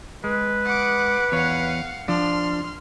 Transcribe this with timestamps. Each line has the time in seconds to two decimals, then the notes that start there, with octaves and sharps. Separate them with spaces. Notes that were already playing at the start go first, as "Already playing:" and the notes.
0.24 G#3 B4
0.65 F#5 D6
1.32 E2 C#5 F5 F#5
2.08 F3 D4 C6 F6